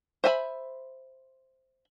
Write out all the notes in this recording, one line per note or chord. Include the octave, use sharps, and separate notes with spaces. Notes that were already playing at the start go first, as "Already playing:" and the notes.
C5 E5 G#5 A5 B5